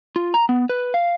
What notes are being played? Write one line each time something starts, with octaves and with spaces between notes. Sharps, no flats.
F4
A#5
B3
B4
F5